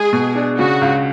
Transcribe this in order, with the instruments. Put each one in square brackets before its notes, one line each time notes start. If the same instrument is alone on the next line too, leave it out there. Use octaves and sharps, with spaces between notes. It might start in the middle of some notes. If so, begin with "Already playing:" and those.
Already playing: [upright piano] G#3 [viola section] G#4
[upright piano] B2
D4
[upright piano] C#3 [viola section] F#4
[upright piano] C#2